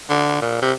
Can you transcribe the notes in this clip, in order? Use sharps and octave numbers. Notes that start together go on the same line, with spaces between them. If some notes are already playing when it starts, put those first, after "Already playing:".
D3
A#2
C3